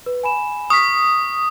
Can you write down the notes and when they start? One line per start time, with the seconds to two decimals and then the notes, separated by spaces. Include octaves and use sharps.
0.06 B4
0.23 G#5 B5 E7
0.70 C#6 D#6 F6 B6